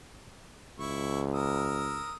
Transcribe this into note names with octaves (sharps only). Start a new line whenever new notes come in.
C#2 E4 C#6
A#4 D#6 E6